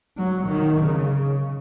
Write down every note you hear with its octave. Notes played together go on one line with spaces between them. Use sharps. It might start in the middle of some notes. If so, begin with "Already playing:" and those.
F#3
D#3
C#3